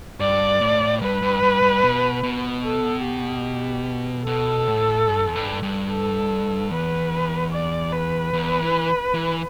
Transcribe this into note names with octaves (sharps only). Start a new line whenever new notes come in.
G2 D5
A2
G2 B4
G2
G2
G2
B2
B2
A4
G4
B2 A4
A2
G2
E2
G2
G2
A4
E2 B4
D5
B4
E2
E3
E3